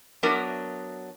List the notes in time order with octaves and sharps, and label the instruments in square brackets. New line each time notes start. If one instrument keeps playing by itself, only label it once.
[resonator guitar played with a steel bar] F#3 B3 D4 A#4 E5